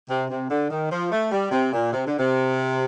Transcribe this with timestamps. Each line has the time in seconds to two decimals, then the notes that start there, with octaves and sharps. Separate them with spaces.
0.09 C3
0.30 C3
0.50 D3
0.71 D#3
0.91 F3
1.12 A3
1.31 G3
1.51 C3
1.73 A#2
1.93 C3
2.06 D3
2.19 C3